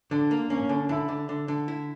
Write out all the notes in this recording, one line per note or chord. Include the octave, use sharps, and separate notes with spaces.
D3 D4
A#3
A#3 C#4
D3
D3 E4
D3
D3
D3
E4